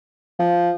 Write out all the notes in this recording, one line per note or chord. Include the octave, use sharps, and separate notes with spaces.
F3